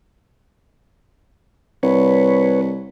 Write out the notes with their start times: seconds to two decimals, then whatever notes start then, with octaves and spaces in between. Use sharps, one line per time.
1.83 C2 B4 C#5